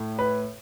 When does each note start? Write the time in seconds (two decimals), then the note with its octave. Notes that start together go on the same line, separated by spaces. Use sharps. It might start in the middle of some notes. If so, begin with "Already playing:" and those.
Already playing: A2
0.19 B4